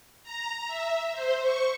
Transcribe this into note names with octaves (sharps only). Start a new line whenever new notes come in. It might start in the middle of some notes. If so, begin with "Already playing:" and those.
A#5
E5
C5
C#6